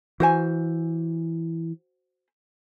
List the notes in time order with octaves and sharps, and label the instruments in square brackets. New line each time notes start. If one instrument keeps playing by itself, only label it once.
[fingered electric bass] E3 [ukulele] F#4 C5 G#5